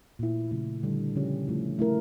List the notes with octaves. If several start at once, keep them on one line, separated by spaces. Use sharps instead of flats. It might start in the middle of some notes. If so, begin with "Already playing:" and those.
A#2 A3 E4
C#3 F3 A3 E4
D3 G3 D4 A4
C#3 F3 C#4 G4
F3 A3 C#4 E4
A3 E4 A#4